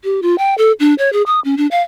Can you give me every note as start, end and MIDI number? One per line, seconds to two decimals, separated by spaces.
0.04 0.20 67
0.22 0.36 65
0.38 0.55 79
0.58 0.72 69
0.80 0.94 62
0.98 1.10 73
1.13 1.22 68
1.26 1.40 87
1.45 1.55 61
1.57 1.67 62
1.71 1.82 77